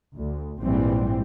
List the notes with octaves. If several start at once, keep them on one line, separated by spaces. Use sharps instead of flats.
D2
A#1 G#2 E3 G3 C4